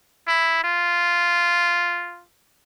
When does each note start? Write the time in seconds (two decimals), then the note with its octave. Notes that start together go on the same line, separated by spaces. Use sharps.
0.28 E4
0.64 F4